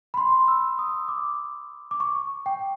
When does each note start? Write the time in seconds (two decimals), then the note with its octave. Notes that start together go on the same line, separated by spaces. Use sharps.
0.14 B5
0.17 C6
0.48 E6
0.79 D#6
1.08 D6
1.91 D6
2.00 C#6
2.46 G5